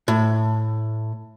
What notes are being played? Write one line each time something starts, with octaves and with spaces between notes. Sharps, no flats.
A2